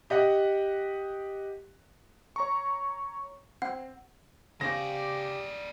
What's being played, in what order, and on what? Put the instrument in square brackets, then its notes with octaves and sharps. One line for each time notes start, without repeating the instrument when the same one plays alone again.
[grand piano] G4 D#5 F#5
[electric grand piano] C#5 A#5 C#6
[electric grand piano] C4 [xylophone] F#5
[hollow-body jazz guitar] C#3 C5 F5 [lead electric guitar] G#3 D5 [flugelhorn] G4 [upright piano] A#6